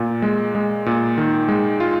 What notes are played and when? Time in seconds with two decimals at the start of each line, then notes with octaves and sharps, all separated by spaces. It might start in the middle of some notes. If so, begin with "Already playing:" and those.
Already playing: A#2
0.22 G#3
0.55 G#3
0.86 A#2
1.18 D#3
1.48 G#3
1.80 F4